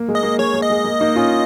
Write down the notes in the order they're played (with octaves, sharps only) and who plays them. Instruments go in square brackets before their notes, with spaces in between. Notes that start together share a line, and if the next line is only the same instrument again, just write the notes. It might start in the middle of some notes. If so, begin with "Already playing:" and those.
Already playing: [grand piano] A#3
G#3
[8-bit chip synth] D#5
[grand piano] A#3
[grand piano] G#3 [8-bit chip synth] C#5
[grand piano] A#3
[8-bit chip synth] D#5
[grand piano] G#3
A#3
A#3 D#4
C#4 F4